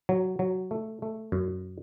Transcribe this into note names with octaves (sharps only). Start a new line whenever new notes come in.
F#3
F#3
A3
A3
F#2